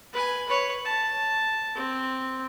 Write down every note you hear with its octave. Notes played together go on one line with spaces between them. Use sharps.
B4 G#5
B4 C#5
A5
C4